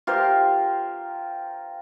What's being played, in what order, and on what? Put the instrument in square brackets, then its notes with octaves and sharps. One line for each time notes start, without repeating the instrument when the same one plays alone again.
[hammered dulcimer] F4 G4 A#4 C5